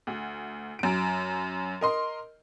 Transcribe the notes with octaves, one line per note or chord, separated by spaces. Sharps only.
D2
F#2 D7
A#4 D#5 C6